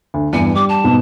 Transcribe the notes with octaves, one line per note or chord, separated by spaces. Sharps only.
D2
E2 G2 G#5 C#7
G3 D6
A5
G#2 B2